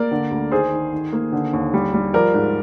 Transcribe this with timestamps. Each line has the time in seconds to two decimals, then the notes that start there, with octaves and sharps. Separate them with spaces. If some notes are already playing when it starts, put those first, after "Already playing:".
Already playing: A#3 A#4 D5
0.11 D3
0.31 D2
0.51 D#3 G#4 C5
0.72 D#3
0.93 D#3
1.13 A#3
1.32 D3
1.53 D#2
1.74 G3
1.94 G3
2.13 F3 A#4 D5
2.34 G#2